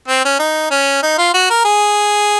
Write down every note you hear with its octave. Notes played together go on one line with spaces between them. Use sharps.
C4
C#4
D#4
C#4
D#4
F4
F#4
A#4
G#4